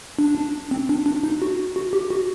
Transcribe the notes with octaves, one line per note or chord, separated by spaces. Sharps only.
D4
C4
D4
D4
D#4
F#4
F#4
G4
F#4